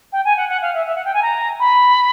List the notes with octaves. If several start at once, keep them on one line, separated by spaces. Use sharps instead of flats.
G5
G#5
F#5
F#5
F5
E5
E5
F#5
G5
G#5
A#5
B5